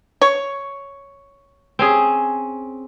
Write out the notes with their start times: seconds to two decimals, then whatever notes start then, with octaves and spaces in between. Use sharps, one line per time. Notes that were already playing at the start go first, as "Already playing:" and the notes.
0.22 C#5
1.79 C4 C#4 G#4